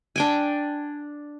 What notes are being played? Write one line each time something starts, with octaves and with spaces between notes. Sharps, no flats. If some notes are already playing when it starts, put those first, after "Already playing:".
D4 G5 G#5